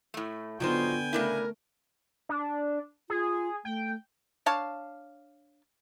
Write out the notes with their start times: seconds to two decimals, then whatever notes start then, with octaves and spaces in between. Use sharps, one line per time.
0.14 A2 A3
0.60 D3 F#3 B3 D#4 F4 C5 G5 G#5
1.13 C#3 A3 D4 E4 A#4
2.29 D4
3.10 F4 G#4
3.65 A3 G5
4.46 D4 C#5 F5 A5